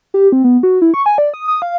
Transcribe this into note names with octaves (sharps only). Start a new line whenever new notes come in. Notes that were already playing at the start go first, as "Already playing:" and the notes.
G4
C4
B3
F#4
E4
C#6
G#5
D5
D#6
D#6
F5